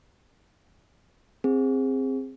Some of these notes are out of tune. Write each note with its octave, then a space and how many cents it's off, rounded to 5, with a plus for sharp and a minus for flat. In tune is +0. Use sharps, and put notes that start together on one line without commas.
C4 +10 G#4 -20